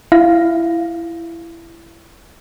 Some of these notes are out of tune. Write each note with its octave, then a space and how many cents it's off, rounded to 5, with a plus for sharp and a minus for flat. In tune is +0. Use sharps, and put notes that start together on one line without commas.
E4 +20 F5 +0